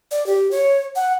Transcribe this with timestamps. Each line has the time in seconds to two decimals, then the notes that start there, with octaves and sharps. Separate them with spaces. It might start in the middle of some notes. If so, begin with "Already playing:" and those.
0.11 D5
0.26 G4
0.51 C#5
0.96 F#5